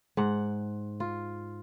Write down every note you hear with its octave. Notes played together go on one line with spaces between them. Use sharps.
G#2 F#5
F4